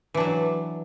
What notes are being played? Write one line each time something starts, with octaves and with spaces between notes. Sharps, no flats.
E3 F#3 D4